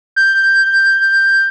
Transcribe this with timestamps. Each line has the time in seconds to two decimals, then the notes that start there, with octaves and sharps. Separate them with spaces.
0.16 G6